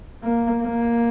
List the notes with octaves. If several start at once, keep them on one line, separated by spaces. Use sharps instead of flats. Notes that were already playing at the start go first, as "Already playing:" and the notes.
A#3
A#3